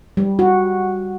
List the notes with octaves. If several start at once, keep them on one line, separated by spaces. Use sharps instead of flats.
G3
F#4